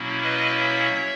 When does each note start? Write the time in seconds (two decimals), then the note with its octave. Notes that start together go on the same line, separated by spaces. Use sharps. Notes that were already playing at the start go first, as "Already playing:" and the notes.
Already playing: B2 F#3 A#3 C#4 E4
0.23 B4 D#5
0.56 C#5 E5